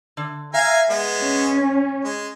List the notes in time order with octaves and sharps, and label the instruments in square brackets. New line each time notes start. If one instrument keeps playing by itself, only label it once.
[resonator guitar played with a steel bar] D3
[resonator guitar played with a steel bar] E5 [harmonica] F5 G#5 A#5
[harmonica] G#3 B3
[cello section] C#4
[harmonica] G#3